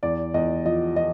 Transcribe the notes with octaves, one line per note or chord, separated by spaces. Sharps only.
E2 D5
E2 D#5
F3 D#5
F3 D#5